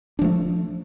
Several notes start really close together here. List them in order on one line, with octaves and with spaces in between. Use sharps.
D4 F3 A3